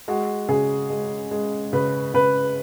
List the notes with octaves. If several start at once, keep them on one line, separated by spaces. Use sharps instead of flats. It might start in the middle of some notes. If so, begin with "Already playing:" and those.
G#3 F#4
C#3 G#4
G#3
G#3
C#3 B4
C#3 B4